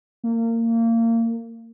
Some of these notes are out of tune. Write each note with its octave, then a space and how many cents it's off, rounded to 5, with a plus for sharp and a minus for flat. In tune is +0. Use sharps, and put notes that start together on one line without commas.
A#3 -25